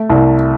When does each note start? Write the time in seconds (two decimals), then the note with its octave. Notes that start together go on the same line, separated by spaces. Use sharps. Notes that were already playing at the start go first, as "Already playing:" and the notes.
Already playing: A3
0.10 C2